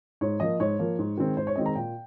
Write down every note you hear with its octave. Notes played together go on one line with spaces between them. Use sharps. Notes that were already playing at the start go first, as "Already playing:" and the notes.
G#2 C#5
F3 A#3 D#5
G#2 C#5
F3 A#3
G#2
D#3 G#3 C4
G#2 C5
C#5
D#3 G#3 C4 D#5
A#5
A#2 G5